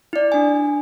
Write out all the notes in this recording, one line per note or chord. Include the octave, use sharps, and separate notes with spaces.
E4 D5
D4 G#5